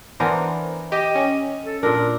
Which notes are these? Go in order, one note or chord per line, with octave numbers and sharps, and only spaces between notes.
E3 B3 D4 A#4 C5
G4 D#5
C#4
A4
A#2 D4 A#4